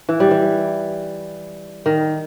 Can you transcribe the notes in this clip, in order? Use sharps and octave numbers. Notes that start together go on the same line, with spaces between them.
E3
G3
E3
D#3